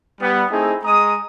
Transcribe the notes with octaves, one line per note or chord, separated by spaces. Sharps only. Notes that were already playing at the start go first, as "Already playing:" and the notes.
G3 B3
A3 C4 D#4 E4 G#4
G#3 A#5 D#6